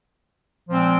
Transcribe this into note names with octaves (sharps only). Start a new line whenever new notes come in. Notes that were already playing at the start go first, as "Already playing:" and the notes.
A#2 F3 G#3 C4